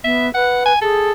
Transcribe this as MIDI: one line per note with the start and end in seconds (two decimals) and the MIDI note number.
0.04 0.33 59
0.04 0.27 76
0.34 0.73 71
0.34 0.65 78
0.66 0.81 80
0.81 1.13 68
0.81 1.12 69